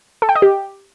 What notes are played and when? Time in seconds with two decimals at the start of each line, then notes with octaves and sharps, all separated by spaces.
0.22 A4
0.29 G5
0.35 D#5
0.42 G4